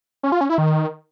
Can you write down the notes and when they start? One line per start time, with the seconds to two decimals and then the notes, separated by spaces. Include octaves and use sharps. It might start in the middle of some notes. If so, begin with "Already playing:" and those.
0.23 C#4
0.32 F4
0.41 C#4
0.49 E4
0.58 D#3